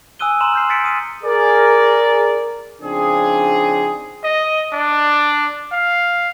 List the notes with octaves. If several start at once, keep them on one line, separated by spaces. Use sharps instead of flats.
G#5 D#6 E6 F#6 D#7 G7
A#5 C6 E7 F#7
F6 G6 C7
A6 B6 C#7 D7
D#6 F6 D#7
G#4 A#4 D5
C#3 F3 C4 D4 D#4 G#4
D#5
D4
F5